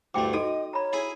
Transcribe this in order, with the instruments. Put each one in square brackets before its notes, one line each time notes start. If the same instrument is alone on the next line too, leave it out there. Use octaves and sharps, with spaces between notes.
[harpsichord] D2 G2 A3 [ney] E4 [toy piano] G4 G5 D6
[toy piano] D#4 F#4 A4 [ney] D#5 [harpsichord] D#6
[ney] C#5 [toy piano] A#5 B5
[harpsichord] E4 G#4 G#5